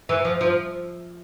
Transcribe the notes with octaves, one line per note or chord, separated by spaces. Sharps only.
E3
F3
F3